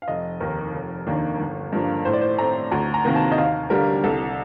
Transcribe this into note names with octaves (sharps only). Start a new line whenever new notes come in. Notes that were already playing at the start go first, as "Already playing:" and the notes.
F5
F1 D#5
D#2 D#3 A#4
F1
D#2 D#3 A#3 D4
G1
G2 F3 A#3 D4
A2 C5
D5
C5
A3 C4 A#5
D2 A#5
A#5
C3 D#3 A#3
A5
D#5
D#2 F5
D3 G3 A#4
C2 A4